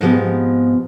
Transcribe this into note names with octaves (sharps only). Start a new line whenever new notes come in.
G#2 B2 F3 B3 C4 G4